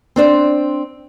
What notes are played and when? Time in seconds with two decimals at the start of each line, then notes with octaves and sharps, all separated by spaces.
0.16 C4 D4 C5